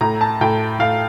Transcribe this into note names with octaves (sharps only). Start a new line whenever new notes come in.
A2 A#5
A5
A2 G5
A2 F5